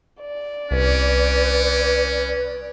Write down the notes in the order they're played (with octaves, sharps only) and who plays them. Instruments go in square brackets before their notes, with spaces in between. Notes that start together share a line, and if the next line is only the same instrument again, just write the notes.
[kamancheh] D5
[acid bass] C2 [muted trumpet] C#4 [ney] B4